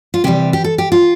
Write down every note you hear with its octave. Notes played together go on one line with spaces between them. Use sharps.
F4
C3 E3 G3 G4
G4
A4
G4
F4